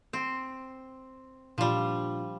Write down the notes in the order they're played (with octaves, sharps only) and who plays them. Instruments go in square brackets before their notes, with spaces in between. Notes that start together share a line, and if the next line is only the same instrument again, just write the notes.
[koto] C4
[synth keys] A#2 D4 F4 [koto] F3 G3